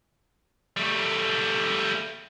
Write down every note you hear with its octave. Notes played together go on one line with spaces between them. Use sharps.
G3 A3